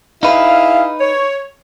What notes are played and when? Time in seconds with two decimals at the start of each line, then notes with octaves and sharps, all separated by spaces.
0.23 D#4 E4 G#4 B4 F5
1.00 C#5